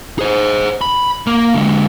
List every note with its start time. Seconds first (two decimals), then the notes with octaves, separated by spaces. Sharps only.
0.19 G#4 C5
0.81 B5
1.27 A#3 A#4
1.54 D3 G#3